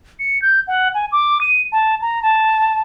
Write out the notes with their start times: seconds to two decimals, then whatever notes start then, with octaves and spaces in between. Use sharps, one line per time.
0.19 C#7
0.42 G6
0.68 F#5
0.94 G#5
1.12 D6
1.41 D#7
1.72 A5
2.02 A#5
2.23 A5